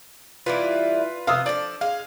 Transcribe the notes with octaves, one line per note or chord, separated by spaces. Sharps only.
E3 G3 E4 F4 B4
C3 B3 D#5 F5 D#6 E6
F3 D4 A4 D5
G#3 F5